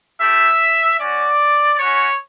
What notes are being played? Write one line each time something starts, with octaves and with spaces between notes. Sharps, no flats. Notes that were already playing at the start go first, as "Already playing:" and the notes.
A3 E4 G4 E5
C#4 F#4 D5
C#4 F#4 C#5